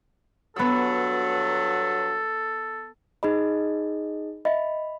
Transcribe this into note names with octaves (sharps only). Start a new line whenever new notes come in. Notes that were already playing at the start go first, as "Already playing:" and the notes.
G2 F#3 B3 A4 E6
D#4 G#4 D#5 B5
D#5 E5 B5